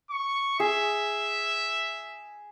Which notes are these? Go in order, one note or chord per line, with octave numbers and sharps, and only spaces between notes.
C#6
G#4 E5